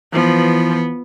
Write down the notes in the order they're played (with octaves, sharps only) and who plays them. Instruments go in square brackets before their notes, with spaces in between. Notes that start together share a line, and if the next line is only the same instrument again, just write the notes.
[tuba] E3 [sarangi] F3 [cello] B3